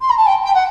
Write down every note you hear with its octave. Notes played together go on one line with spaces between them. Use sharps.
C6
A#5
A5
G5
G5
F#5